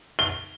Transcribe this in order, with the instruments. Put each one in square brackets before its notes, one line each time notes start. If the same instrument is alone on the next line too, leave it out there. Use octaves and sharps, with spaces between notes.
[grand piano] G7